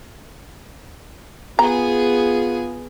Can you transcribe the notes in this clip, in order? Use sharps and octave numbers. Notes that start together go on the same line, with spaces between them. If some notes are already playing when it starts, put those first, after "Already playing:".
B3 F4 G#4 A#5